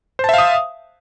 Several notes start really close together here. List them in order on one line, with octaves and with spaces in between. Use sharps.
C5 A5 E5 F5 D#6